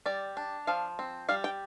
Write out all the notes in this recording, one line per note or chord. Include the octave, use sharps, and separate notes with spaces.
G3 D5
D4
F3 F5
C4
G3 F5
G5